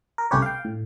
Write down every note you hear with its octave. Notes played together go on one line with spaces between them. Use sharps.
A#4
C2 A3 C#4 G4 B4 C#5
F5 G5
A2